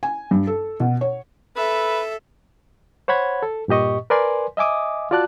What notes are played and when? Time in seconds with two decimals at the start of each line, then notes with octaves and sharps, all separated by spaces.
0.03 G#5
0.31 G2
0.47 A4
0.80 B2
1.01 C#5
1.56 A4 B4 E5
3.08 C5 C#5 F#5 B5 G#6
3.43 A4
3.68 G2 A#2 G4 D#5 C#6
4.10 A#4 B4 D5 G#5 C6
4.57 D#5 E5 G#5 D6 D#6
5.11 F4 F#4 D5 A5 F#6